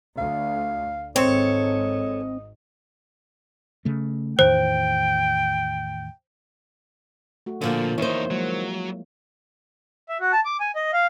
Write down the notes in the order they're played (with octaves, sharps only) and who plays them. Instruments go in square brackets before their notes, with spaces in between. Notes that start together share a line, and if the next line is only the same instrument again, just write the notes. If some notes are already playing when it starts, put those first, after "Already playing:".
[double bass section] D2 [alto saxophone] F5
[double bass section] G#1 G#2 [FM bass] C4 [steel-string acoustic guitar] A4 C#5 [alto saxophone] D#5
[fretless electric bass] C#3 A3
[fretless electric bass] E2 A2 D#3 [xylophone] C5 [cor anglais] G5
[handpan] A3 F#4
[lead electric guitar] A#2 [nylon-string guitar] D3 F3 A#3
[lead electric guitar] E2 D#4 [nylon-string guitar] D#3 C5 [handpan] A#3 E4 C#5
[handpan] F3 G#3 A#3 [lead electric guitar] F#3
[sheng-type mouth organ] E5
F#4
A5
D6
G#5
D#5
F5